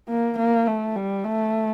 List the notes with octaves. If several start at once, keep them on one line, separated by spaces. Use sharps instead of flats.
A#3
A#3
A3
G3
A3